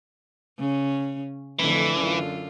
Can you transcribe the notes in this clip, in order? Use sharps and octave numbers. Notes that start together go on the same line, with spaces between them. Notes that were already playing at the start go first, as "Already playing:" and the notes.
C#3 C#4
F2 A2 D3 E3
F#2 D3 F4